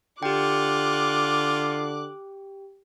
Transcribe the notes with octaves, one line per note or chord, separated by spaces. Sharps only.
D3 F4 G4 G5 D6 F#6